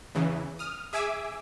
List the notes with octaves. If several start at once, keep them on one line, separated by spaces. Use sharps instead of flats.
E2 C#3 E3
D#6 F6
G#4 E5 G#5 D6 E6